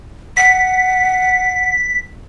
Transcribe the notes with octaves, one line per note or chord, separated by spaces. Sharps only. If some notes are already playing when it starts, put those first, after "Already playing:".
F#5 B6